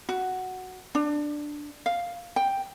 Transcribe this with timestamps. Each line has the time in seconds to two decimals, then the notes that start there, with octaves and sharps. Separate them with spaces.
0.09 F#4
0.95 D4
1.86 F5
2.36 G5